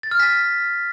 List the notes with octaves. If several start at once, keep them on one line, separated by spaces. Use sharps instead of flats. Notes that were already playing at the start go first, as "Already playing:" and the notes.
A6
F6
B6